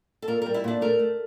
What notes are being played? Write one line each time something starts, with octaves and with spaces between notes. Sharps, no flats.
A4
A#2 A#4
G3 A#4
E4
A#2 D4
A3 A#4
A3